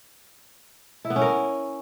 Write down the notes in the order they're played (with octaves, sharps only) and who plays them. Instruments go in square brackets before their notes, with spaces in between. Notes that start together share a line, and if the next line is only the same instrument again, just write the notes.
[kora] E4
B3
C#4
A#4